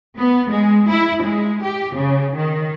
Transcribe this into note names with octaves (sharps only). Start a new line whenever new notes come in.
B3
G#3
E4
G#3
G4
C#3
D#3